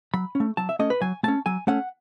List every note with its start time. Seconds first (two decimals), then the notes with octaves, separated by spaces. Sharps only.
0.14 F#3 B5
0.35 C#4
0.40 A3
0.57 F#3 A5
0.69 E5
0.79 A3 C#4 D#5
0.90 B4
1.01 F#3 G#5
1.23 A3 C#4 A5
1.46 F#3 G#5
1.67 A3 C#4 F#5